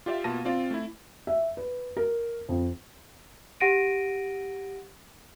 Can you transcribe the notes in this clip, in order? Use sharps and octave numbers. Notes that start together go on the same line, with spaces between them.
F4 G4 D5 E5 F5
B2 A#3 F4 A5 A#6 D#7
C4 F4 D5
A3 E4
E5
B4
A#4
F2
G4 F#5 A#6 D7 D#7